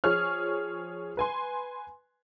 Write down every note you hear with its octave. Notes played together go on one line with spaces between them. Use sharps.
F3 G#4 C#5 F6
B4 G#5 C6